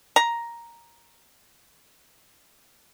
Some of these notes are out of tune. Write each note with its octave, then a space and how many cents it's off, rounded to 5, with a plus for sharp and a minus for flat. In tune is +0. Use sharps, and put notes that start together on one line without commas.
A#5 +5